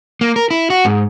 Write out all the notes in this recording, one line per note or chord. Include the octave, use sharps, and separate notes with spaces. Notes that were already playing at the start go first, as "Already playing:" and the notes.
A#3
A#4
E4
F#4
G#2